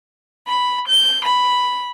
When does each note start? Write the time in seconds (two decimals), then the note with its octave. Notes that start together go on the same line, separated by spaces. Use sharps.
0.47 B5
0.90 G6
1.26 B5